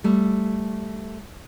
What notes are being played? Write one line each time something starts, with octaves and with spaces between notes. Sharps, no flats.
G3 A3